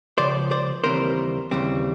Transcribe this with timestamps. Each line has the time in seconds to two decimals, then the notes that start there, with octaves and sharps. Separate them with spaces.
0.18 C#2 C#3 F3 C5 D5
0.51 C5 D5
0.84 D#2 C#3 E3 G3 C4 A#4 C5
1.51 D#2 C#3 E3 G3 C4